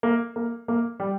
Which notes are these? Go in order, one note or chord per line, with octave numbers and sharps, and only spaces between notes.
A#3
A#3
A#3
G3